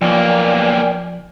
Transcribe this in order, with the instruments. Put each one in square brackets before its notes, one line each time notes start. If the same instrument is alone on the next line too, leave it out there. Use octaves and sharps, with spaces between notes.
[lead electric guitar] B1 A#3 [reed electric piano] F3 [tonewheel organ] D5 G5 G#5